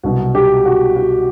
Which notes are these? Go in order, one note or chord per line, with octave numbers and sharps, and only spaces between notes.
C2 B2 F#3 F#4
G4
F#4
F#4